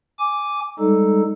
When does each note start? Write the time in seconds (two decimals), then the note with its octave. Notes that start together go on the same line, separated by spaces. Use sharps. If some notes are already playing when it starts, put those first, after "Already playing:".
0.19 G#5 D6
0.79 G3 G#3 D#4 A4